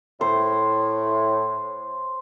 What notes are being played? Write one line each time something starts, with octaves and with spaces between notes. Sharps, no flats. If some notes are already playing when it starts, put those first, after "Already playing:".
A2 C5